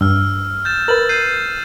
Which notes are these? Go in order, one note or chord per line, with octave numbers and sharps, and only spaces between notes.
G2 E6 F6
G6 A6 E7
A#4 B4 A6 F#7
G6 C7 D#7